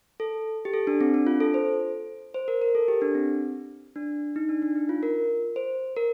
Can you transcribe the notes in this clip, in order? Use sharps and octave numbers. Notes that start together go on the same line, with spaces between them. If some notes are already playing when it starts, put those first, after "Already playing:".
A4
G4
A4
D4
C4
D4
F4
A4
C5
C5
A#4
A#4
A4
G4
D4
C4
D4
D#4
D4
D4
D#4
F4
A#4
C5
A#4